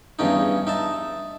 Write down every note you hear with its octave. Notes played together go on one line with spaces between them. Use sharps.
E2 G2 C#3 C#4 D#4
D#4 E5 A5